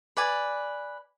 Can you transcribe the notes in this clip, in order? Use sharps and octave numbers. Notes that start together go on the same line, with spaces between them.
B4 D5 G#5